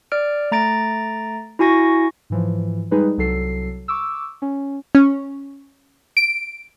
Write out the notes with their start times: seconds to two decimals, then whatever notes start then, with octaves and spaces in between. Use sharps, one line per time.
0.12 D5 F6 D7
0.52 A3 A#5 A6 D7
1.59 E4 F#4 G#5 C#6 A#6
2.30 G#2 E3 F3
2.91 G3 G#3 D#4 G#4 B4
3.18 C2 F#3 A4 C7
3.88 C#6 D6 E6
4.42 C#4
4.95 C#4
6.17 D7